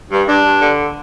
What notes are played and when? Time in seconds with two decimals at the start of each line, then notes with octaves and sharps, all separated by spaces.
0.11 G2
0.27 G2 D4
0.45 G2
0.61 D3